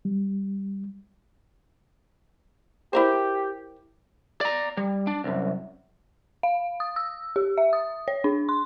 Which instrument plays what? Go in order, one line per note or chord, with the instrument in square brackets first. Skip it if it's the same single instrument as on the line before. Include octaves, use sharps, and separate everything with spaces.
[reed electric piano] G3
[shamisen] E4 A#4 C5 [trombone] G4
[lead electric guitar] D5 A#5
G3
D4
C2 F#2
[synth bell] F5
D#6
E6
G4
E5
D#6
C#5
D4
C6